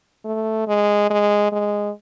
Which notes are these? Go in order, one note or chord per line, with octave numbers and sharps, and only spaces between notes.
A3
G#3
G#3
G#3